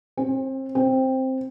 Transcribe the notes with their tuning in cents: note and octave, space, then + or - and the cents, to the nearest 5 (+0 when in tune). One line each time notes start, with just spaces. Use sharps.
C4 +30
C4 +5